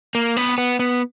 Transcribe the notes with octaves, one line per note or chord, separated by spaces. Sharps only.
A#3
B3
B3
B3